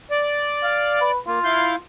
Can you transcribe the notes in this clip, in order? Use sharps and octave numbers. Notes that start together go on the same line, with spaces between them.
D5
F5
B4
A#3 F4
E4 F5 G6